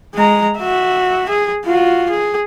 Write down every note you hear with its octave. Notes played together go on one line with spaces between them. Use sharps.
G#3 A#5
F#4 E5
G#4
F4 F#4
G#4